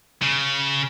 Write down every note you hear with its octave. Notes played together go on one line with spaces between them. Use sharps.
C#3